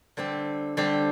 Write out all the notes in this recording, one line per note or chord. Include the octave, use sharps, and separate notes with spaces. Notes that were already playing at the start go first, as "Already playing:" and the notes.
D3 G3 C4 G4
D3 G3 C4 G4